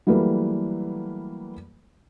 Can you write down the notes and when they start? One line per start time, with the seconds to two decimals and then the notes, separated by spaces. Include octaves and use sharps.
0.07 E3 F#3 G3 A3 A#3 B4